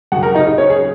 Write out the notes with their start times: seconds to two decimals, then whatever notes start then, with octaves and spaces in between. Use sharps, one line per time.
0.12 F#2 F#4 F#5
0.16 C#3
0.23 A#4 A#5
0.34 D#4 D#5
0.47 D#4 D#5
0.58 C#4 C#5
0.70 G#4